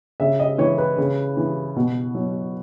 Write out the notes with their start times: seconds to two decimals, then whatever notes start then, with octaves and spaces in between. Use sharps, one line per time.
0.20 C#3 E5
0.40 D#5
0.58 E3 C#5
0.78 B4
0.98 C#3
1.37 E3
1.76 B2
2.15 F#3